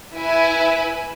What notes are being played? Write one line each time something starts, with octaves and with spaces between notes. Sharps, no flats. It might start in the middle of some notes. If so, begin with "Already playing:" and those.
E4 B4 E5 G#5